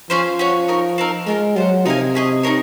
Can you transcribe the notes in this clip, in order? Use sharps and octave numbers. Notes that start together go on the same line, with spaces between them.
F3 C#4 G#4 C5 F5
C#4 F#4 C#5 F#5
D#4 A#4 C#5
C4 D#4 A#4
G#3 A#3 F4 A#4
F#3 F4 C5 F#5
C3 D#4 A#4 F5 G#5
C#4 G#4 D#5
D#4 A#4 C#5